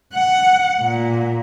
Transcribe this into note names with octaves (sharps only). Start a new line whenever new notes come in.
F#5
A#2